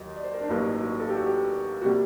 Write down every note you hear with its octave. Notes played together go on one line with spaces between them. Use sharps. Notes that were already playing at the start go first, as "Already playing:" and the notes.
Already playing: D#2 D#3 F#3 D#5
D5
C5
A#4
D4
A1 G2 F#3 A#3 D#4
F#4
A4
G4
F#4
G4
C3 G3 A#3 F#4